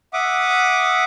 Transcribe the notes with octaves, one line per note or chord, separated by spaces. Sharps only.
E5 F#5 D6 D#6